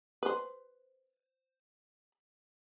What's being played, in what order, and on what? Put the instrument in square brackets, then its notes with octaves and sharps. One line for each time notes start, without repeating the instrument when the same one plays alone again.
[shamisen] B4 C5